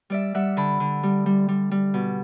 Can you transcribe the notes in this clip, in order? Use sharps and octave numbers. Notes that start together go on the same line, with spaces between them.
G3 D5 E5
G3 E5 F#5
D3 A5 B5
D3
G3
G3
G3
G3
B2